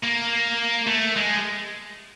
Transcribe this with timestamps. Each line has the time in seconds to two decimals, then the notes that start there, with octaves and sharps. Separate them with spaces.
0.03 A#3
0.87 A3
1.16 G#3